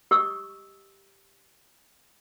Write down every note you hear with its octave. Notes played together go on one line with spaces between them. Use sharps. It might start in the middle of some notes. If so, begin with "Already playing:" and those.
G4 D#5 C#6 D#6 E6